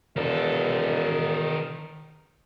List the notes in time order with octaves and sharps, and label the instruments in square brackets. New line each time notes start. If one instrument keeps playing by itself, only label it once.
[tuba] E1 [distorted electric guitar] D#3 A4